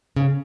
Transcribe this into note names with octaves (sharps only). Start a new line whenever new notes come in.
C#3